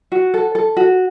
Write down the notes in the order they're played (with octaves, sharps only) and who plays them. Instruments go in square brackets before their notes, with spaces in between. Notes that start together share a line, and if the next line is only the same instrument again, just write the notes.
[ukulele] F#4
A4
A4
F#4